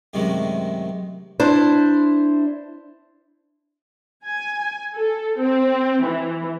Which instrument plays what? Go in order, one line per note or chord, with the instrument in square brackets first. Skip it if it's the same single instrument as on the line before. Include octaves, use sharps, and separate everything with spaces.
[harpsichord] F#2 A2 C3 D#3 F#3 G#3
[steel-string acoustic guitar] D4 E4 C5
[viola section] G#5
A4
C4
E3